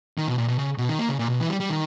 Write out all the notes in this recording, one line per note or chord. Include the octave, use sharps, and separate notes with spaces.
D#3
B2
A#2
B2
C#3
B2
D#3
A#3
C#3
A#2
B2
E3
G3
G3
D#3